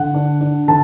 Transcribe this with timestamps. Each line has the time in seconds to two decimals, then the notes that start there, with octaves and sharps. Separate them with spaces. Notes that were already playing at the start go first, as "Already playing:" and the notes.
Already playing: D3 F#5
0.14 D4
0.41 D4
0.68 D3 A5